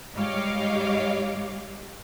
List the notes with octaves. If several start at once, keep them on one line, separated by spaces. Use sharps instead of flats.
G#2 G3 C#5 D#5 F5 D6